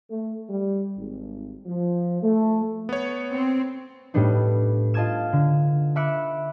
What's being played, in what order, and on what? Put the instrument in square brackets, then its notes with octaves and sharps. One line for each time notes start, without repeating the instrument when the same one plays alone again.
[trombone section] A3
G3
G#1
F3
A3
[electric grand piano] B3 C#5
[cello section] C4
[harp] A2 G3 B3 D4 D#4
F4 D#5 A5 D#6 G#6 E7
D3
E5 B5 D6 E6 F#6 C#7